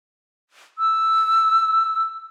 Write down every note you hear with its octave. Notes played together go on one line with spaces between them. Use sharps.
E6